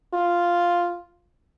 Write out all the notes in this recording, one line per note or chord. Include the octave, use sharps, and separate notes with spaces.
F4